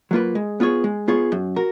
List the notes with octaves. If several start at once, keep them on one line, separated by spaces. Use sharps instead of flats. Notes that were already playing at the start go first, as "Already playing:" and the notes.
F#3 A#3 F4 B4
G#3
B3 F4 G#4 C#5
G#3
B3 F4 G#4 C#5
F#2
F#4 A#4